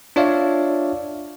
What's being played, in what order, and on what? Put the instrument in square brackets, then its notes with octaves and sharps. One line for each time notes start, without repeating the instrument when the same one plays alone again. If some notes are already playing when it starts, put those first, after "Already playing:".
[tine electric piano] D4 F4 C#5 D5 E5 F5